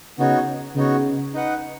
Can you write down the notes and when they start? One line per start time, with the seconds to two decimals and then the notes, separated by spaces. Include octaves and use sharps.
0.18 C#3 B3 D#4 F#4 C#5
0.76 C#3 B3 D#4 F#4 C#5
1.34 D#4 B4 F#5